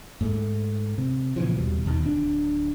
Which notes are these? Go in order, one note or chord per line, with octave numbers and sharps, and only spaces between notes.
G#2 A3
C3
A#2 C#3 E3 F3
D#2 B2 G3
D#2 B2 D3 D#3
D1 D4